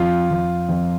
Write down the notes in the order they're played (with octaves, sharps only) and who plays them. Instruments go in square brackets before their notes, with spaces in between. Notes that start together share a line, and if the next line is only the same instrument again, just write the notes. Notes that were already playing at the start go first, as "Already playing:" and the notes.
Already playing: [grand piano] F2 [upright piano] F4
[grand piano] F2
F2